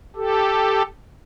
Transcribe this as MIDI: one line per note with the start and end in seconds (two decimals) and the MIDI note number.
0.16 0.82 67
0.16 0.82 69